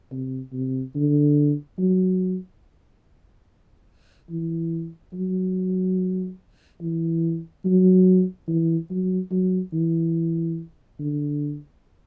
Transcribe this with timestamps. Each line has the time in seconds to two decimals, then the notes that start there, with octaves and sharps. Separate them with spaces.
0.11 C3
0.52 C3
0.95 D3
1.79 F#3
4.30 E3
5.13 F#3
6.81 E3
7.65 F#3
8.48 E3
8.90 F#3
9.31 F#3
9.73 E3
10.99 D3